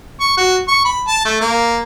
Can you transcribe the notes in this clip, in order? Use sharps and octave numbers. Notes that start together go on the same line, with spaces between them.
C#6
F#4
C#6
B5
A5
A3
A#3